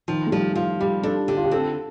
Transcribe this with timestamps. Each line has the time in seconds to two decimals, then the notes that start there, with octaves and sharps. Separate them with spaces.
0.08 D#3 F3
0.27 A3
0.32 F3 G3
0.55 F3 F4
0.80 G3 G4
1.03 D4 A4
1.28 D3 G4
1.37 F4
1.44 G4
1.51 C4 A4